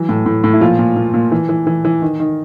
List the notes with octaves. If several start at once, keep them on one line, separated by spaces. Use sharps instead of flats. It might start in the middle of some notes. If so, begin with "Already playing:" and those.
Already playing: E3 F#3
A2
A2
A2
E4
A#2 F3 F4
A#2
A#2
A#2
E3
E3
E3
E3
D#3
D#3